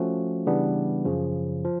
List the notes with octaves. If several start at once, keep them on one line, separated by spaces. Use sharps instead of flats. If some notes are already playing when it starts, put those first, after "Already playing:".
Already playing: F3 A3 C#4 F#4
C#3 E3 G3 B3 D4
F#2 C#3 F3
F3